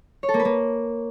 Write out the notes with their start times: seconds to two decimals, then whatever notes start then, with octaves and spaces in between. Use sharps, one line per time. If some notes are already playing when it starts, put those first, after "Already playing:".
0.23 C#5
0.29 A4
0.34 A#3
0.39 B4
0.45 A#3